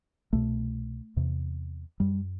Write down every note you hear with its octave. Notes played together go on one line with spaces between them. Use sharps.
C2 B2 A3
E2 C3
F#2 G3